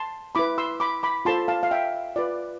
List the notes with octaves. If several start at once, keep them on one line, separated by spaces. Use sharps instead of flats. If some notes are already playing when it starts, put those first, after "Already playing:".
Already playing: A5 C6
E4 B4 B5 D6
C6 E6
B5 D6
B5 D6
F4 A4 C5 A5 C6
F5 A5
F5
E5 G5
F4 B4 D5